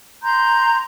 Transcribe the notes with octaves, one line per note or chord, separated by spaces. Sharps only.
A#5 C6 G6